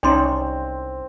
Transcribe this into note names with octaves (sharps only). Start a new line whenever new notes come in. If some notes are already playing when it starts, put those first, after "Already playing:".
C2 C4 C#4 D#4 D5 G5 C6